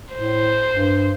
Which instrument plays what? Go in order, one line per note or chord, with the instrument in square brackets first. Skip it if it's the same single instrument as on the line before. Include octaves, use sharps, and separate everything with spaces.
[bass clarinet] A2 [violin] C5
[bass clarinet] G2